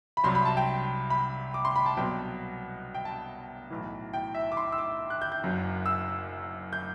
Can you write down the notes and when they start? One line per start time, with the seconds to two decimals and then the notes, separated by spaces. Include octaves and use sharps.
0.17 B5
0.24 C2 C3 F#3 C6
0.35 B5
0.45 A5
0.57 G5
1.10 B5
1.54 D6
1.65 C6
1.76 B5
1.86 A5
1.97 C2 B2 F#3 G5
2.94 G5
3.05 A5
3.70 B1 A2 E3
4.13 G5
4.34 E5
4.52 D6
4.57 C6
4.72 E6
4.78 D6
5.10 F#6
5.22 G6
5.32 G6
5.43 F#1 F#2 F#3
5.86 E6
6.73 G6